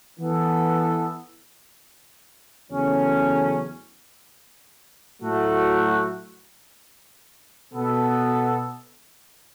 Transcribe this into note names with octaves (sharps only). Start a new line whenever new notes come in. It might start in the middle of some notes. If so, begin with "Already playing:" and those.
E3 B3 A4
E2 C#3 F#3 A3 C#4
A2 F#3 A3 F#4
B2 B3 A4